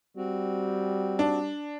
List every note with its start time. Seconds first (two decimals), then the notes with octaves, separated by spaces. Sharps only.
0.17 G3 C4 F#4
1.19 D4